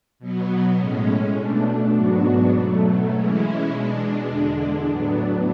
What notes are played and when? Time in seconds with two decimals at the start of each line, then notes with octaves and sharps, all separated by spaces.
0.19 B2 F#3 B3
0.78 A2 G#3 C#4
1.36 B2 A3 D4
1.95 G#2 F#3 B3 D4 F#4
2.52 B2 F#3 A3
3.11 E3 G#3 C#4 E4
3.69 B2 G#3 D4
4.28 E2 D3 G#3 D4
4.86 A2 F#3 B3 D4